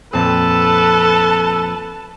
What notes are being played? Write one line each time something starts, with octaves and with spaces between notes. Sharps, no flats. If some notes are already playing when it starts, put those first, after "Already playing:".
F2 A#2 C4 A4 B4 A5